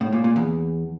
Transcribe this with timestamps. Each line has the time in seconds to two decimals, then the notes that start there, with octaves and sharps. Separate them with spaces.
0.01 A2
0.13 A#2
0.24 A#2
0.36 E2